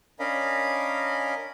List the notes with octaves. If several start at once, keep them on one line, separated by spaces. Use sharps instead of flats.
C#4 D4 A#4 D#5 F5 B5